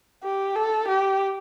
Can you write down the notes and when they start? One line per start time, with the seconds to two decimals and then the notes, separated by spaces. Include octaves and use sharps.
0.24 G4
0.56 A4
0.88 G4